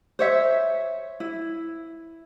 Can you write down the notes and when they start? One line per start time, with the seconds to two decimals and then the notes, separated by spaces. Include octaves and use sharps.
0.19 C5 C#5 E5
1.20 E4